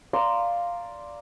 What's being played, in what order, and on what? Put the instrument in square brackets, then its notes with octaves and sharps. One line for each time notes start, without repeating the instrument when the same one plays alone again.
[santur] D5 F5 A#5 C6